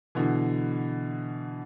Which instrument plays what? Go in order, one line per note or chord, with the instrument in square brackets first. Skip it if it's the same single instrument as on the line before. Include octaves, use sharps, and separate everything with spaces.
[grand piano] B2 D3 E3